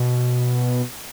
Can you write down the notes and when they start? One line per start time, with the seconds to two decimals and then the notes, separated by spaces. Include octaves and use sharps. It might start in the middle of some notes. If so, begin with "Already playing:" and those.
Already playing: B2